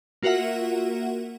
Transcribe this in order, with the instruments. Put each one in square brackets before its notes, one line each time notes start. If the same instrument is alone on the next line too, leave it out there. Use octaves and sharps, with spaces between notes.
[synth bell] A#3 F4 F#4 A#4 E5 F#5